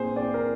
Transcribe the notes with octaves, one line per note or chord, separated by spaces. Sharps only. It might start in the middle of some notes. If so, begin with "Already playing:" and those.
Already playing: A#2 C4 G#4 C5
C4 D5
A#4